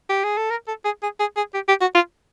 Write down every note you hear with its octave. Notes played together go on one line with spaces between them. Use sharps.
G4
G#4
A4
A#4
A4
G#4
G#4
G#4
G#4
G4
G4
F#4
F4